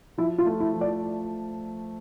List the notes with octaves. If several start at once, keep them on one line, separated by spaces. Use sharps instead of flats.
F3 E4
F4
A3
E4
F3
D5